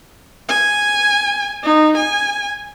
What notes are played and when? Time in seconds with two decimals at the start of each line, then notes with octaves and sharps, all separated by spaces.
0.49 G#5
1.63 D#4
1.97 G#5